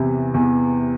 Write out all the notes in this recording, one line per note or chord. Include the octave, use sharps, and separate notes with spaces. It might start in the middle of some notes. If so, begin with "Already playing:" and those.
Already playing: E2 C3 E3
E2